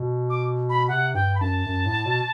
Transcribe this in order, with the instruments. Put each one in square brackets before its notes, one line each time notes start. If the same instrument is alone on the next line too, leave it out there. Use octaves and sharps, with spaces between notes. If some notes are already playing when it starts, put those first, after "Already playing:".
Already playing: [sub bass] B2
[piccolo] D6
B5
[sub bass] C3 [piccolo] F#5
[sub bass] G2 [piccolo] G5
[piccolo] B5
[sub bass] F#2 [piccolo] A5
[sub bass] F#2
A2
B2